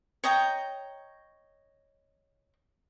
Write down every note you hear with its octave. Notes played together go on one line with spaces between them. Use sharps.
C#5 D#5 G5 A#5